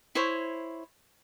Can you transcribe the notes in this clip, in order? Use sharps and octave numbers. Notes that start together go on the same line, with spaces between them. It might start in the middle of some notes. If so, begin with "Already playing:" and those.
E4 C5 C#5